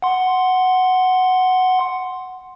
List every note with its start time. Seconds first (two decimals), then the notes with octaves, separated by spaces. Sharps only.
0.02 F#5 C6